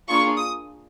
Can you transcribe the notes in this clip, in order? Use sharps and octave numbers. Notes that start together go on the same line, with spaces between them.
A#3 D4 F4 G#4 C#6
D#6